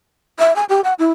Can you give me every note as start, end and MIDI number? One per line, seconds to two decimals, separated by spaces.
0.39 0.55 76
0.56 0.64 80
0.69 0.81 67
0.84 0.93 78
0.99 1.12 64